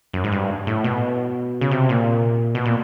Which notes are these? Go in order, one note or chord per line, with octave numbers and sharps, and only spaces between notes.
F#2
G#2
G2
A2
B2
C#3
C3
A#2
B2
A#2